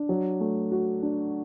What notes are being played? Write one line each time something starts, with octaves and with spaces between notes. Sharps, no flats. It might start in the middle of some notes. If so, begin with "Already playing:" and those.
Already playing: D4
F#3
A3
F#4
D4